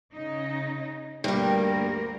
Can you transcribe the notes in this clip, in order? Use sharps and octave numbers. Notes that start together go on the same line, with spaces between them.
C#3 D#4
D2 G2 G3 A#3 A#4